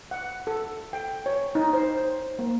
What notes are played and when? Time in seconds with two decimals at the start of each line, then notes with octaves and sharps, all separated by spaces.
0.11 F#5
0.47 A4
0.93 G5
1.26 C#5
1.55 D#4
1.73 C5
2.39 A#3